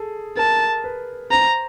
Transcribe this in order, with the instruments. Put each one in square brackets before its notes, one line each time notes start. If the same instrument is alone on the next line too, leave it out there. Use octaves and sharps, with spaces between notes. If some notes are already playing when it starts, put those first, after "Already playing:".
Already playing: [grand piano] G#4 A4
[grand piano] A#4 [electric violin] A5
[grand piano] B4
[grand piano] C5 [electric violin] A#5